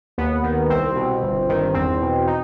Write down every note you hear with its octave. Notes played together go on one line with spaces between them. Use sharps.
D#2 B3
D#3
C2 C4
B2
G1
G2 D#3
E2 C4
B2
D#4